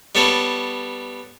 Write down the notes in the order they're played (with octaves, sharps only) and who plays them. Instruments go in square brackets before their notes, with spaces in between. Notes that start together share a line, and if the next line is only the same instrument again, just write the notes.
[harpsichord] G3 B3 A4 C#5